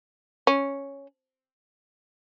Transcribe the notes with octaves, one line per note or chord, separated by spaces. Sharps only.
C#4